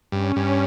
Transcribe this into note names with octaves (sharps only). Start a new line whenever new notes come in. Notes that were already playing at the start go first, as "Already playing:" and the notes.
G2 C#4
G2